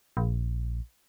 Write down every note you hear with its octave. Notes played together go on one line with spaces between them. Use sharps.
A#1